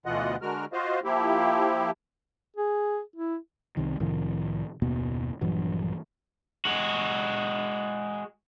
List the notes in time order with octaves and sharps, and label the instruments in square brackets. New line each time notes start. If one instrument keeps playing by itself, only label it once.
[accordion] D2 B2 E3 F4 D#5 F#5
D3 G#3 F#4 A#4 F6
F4 F#4 C5 D#5 F5
F3 A#3 E4 G4
[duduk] G#4
E4
[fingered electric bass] C2 C3 D#3
C2 A2 D#3 F3
F#1 D#2 B2 B3
A#1 G2 E3 F#3
[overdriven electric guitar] G#3 F#4